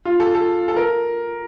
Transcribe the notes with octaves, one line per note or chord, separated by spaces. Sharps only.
F4
A4
A4
A4
A#4